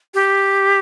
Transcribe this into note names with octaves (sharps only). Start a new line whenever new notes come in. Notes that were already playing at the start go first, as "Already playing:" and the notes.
G4